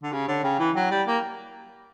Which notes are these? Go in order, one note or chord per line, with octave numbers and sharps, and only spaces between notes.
D3
C#3 G4
D3 C#5
C#3 G5
E3 E4
F#3 G5
G3 G5
A#3 G5